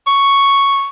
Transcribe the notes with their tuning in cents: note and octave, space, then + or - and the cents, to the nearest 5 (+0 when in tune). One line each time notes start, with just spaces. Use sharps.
C#6 +0